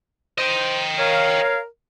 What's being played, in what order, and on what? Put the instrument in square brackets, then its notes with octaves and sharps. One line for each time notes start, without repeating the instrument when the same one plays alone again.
[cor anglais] C5 [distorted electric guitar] D#5 G5
[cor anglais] A#4 [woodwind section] C#5 F5